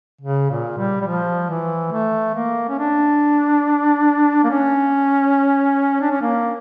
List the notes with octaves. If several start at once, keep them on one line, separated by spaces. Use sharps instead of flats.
C#3
A#2
G3
G3
F3
E3
A3
A#3
C#4
D4
A#3
C#4
D4
C#4
A#3